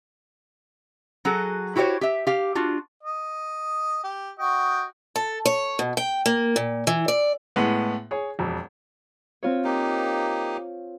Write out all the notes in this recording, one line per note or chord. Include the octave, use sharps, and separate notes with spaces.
F#3 F#4 G#4 A4
E4 F#4 G4 C5 C#5
G4 E5
G4 F5
D4 F4 F#4
D#5
G4
F#4 D#5 G5
A4
C#5
B2
G5
A#3
A#2
E3
D5
A2 G#3 B3
G#4 C#5
E1 F2
C4 F4 C#5
A#3 D#4 G4